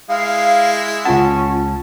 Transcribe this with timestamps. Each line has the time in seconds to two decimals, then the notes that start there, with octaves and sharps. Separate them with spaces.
0.10 G#3 E4 F5
1.05 C#2 C#4 F4 F#5 A5